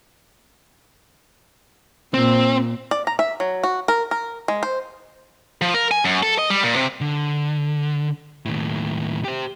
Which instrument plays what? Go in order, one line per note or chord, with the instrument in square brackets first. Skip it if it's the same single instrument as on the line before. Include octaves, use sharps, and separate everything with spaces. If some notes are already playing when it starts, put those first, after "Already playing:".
[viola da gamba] A#2 [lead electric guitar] C4
[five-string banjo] D5
A#5
E5
F#3
F#4
A#4
A#4
G#3
C5
[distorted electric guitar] F3
A#4
G#5
F#2
A4
D#5
G3
A#2
C3
[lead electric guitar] D3
D#2 A2
G4 C5